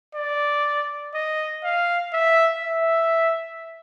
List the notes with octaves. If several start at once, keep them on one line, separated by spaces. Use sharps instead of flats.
D5
D#5
F5
E5
E5